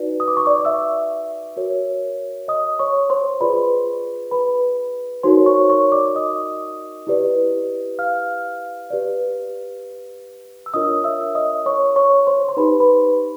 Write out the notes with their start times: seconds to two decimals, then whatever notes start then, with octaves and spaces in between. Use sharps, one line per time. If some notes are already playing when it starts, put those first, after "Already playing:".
Already playing: D#4 F#4 B4 D5
0.20 D#6
0.28 D6
0.37 C#6
0.46 D5 D6
0.65 E5 E6
1.57 F#4 A#4 C#5
2.48 D#5 D#6
2.79 C#5 C#6
3.10 C5 C6
3.40 F4 G#4 B4 D5 B5
4.31 B4 B5
5.23 D#4 F#4 A#4 C5 C#5 C6
5.46 C#5 C#6
5.70 C#5 C#6
5.92 D5 D6
6.15 D#5 D#6
7.07 E4 G4 B4 D5
7.99 F5 F6
8.90 G4 B4 D5
10.66 E6
10.74 D4 F4 A#4 C#5 D#5 D#6
11.04 E5 E6
11.35 D#5 D#6
11.66 C#5 C#6
11.96 C#5 C#6
12.27 C5 C6
12.49 C6
12.57 D#4 G4 B4 C5 B5
12.80 B4 B5